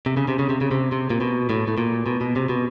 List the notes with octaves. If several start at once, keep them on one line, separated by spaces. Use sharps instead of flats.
C3
C#3
C3
C#3
C3
C#3
C3
C3
A#2
B2
A2
A2
A#2
B2
B2
C3
B2